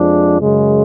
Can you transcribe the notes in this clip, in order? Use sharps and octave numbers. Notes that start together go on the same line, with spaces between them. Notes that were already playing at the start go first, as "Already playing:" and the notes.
Already playing: F2 F3 G#3 D4
F#2 C#3 G#3